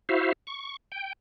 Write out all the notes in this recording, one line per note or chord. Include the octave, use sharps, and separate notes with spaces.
E4 F#4 C5 E5 F5
C#6
G5